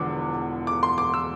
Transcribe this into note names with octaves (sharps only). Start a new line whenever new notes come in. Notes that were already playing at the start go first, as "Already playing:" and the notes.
Already playing: E1 E2 D3 F3 D6
D6
C6
D6
E6